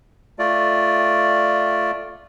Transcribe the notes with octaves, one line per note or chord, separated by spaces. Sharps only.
A3 F4 D5